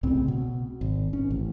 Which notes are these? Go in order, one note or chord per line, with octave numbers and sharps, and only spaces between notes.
C2 A2 C#3 C4
B2
G#1
G#1 C#4
A1